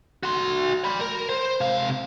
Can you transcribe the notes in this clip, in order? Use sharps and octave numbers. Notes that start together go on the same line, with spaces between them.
F#4 C6
D5 B5
A#4
C5
C3 F5